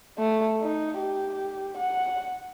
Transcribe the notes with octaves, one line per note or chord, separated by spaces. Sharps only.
A3
D#4
G4
F#5